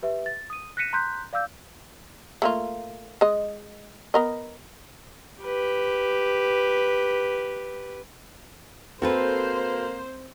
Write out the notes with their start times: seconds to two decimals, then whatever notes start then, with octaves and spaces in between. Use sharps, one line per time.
0.02 G4 B4 E5
0.26 A6
0.50 D#6 D#7
0.77 F#6 A#6 B6 C#7 D#7 E7
0.93 A#5 C6 F#6 G6 B6
1.33 D5 F5 D6 E6 G6
2.42 A3 A#3 F4
3.21 G#3 D#5
4.14 B3 A#4 D#5
5.43 G4 B4
9.02 A#3 C4 F#4 A4 B4 C5